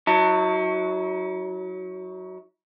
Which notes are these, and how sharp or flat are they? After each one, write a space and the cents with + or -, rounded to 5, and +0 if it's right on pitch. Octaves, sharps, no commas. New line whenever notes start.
F#3 +0 E4 -45 A5 +40